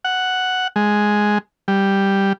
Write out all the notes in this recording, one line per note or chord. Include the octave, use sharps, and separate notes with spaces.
F#5
G#3
G3